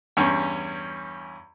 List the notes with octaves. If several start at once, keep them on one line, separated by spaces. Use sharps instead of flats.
E2 G2 C#4